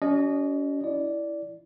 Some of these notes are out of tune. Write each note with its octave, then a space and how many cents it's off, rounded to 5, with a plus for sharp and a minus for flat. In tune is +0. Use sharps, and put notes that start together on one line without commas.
C#4 +40 F#4 +40 D#5 -20
E4 +0 D5 -10